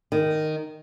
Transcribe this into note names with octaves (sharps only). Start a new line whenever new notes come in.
D#3